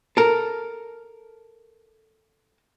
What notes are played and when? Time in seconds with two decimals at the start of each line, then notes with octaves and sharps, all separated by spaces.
0.17 A4 A#4